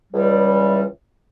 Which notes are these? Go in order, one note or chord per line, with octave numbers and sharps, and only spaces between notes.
C#2 E3 G3